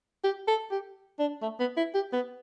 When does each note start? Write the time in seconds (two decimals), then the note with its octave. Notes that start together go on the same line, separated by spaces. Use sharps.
0.24 G4
0.48 A4
0.71 G4
1.19 D4
1.42 A3
1.60 B3
1.77 E4
1.94 G4
2.13 B3